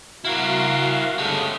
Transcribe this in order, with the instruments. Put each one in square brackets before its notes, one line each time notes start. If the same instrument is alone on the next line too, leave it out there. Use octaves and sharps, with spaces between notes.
[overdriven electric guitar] E4 A#4 [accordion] F#4 F5
[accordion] C#3 G#3 A3 [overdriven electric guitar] G4 A4